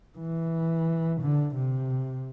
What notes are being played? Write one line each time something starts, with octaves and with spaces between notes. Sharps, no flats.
E3
D3
C3